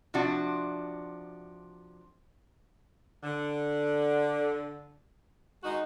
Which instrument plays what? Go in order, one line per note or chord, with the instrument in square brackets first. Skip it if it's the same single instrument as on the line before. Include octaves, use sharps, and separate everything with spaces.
[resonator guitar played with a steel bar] C3 F3 D4 F#4
[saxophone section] D3
G#3 D#4 F#4